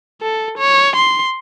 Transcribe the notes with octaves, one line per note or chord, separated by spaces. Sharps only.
A4
C#5
C6